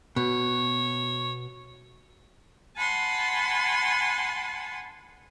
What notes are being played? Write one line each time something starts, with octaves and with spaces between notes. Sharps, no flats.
B2 C#5
F#5 G#5 A5 B5 C6